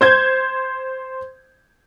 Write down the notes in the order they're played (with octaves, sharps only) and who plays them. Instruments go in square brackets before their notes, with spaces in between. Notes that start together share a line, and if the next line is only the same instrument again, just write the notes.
[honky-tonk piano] C5 G6 G#6